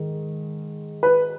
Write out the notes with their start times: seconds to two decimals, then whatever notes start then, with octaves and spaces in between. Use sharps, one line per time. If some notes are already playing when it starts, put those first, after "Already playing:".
Already playing: G#2 D#3 G#3
1.03 B4